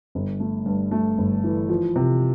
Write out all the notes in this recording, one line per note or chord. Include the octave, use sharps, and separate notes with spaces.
G1
A3
G2
A3
G1
E3
F3
C3